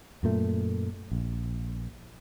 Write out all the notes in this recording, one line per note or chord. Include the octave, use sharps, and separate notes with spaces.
F#2 A#2 A3
A#1